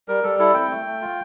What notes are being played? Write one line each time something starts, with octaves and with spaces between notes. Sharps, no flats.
G3 A#4
G3 A4
E4 A4
C4 G5
A3
A3
F4